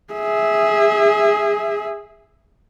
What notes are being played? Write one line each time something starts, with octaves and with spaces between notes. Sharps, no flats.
G#4 E5